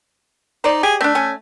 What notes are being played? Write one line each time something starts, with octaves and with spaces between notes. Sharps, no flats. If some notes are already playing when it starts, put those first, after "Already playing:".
D#4 C5 D5
G4 G#4
A3 C4 D4
C#4 G#5